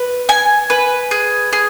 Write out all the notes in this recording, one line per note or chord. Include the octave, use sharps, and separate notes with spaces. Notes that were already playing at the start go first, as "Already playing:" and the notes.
Already playing: B4
G#5
B4
G#4
G#4